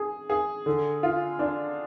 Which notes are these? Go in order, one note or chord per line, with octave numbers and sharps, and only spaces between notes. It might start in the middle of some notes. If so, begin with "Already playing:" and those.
Already playing: G#4
G#4
D3
F4
D4